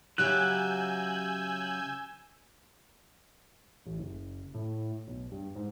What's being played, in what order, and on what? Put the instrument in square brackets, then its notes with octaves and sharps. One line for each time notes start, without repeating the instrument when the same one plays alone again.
[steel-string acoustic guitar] C#3 G4 E5 [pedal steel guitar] F#3 F#6 [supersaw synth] G#5 E6 G6
[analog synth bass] A1
F#1
A2
B1
G2
G#2